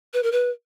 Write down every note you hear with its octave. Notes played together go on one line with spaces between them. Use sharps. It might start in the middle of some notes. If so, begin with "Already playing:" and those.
B4
A#4
B4